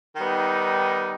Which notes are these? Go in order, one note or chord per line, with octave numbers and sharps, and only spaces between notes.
D#3 G3 B3 D#4